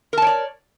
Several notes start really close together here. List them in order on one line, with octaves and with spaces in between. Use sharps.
A#4 A5 C#5 D5